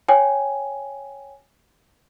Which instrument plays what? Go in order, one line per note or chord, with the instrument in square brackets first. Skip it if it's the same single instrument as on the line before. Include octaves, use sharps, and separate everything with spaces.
[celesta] C#5 G5 G#5